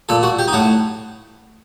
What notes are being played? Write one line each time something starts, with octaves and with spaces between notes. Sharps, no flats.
A#2 A4
F#4
G4
D#4
A2 F#4